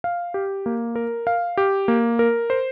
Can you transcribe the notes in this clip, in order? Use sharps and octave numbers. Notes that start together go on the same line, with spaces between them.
F5
G4
A#3
A#4
F5
G4
A#3
A#4
C5